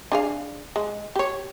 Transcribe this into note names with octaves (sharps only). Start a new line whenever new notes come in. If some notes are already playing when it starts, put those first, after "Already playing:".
D4 G#4 F5
G#3
G4 C#5